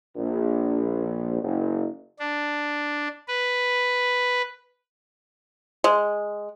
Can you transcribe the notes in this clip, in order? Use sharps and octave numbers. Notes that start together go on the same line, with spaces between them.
A#1
F#1
D4
B4
G#3